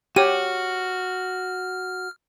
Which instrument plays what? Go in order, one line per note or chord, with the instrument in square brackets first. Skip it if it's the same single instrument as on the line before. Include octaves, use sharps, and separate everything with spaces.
[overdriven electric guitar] F#4 [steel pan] G4 [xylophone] C#5 D#7 [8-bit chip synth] F6